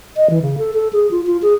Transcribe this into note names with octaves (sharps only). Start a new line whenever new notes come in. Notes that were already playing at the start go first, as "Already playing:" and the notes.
D#5
E3
C#3
A4
A4
G#4
F4
F4
G#4